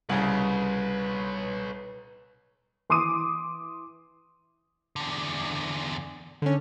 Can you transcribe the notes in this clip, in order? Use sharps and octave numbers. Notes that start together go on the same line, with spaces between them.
C2 C#3 B4 C#5
E3 C6 D6 D#6 D#7
E2 D3
D3 C#4